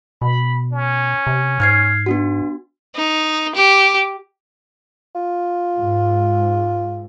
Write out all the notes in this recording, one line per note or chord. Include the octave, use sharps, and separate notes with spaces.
B2 B5
C#4
C3
G#2 F6 G#6 C7
B3 D4 F#4
D#4
G4
F4
G#2